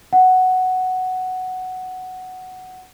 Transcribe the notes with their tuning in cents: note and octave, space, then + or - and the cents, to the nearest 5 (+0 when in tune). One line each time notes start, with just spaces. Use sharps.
F#5 +5